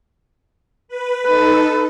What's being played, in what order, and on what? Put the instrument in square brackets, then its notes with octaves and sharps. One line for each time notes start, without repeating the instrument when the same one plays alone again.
[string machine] B4
[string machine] D#4 A4 [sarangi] B4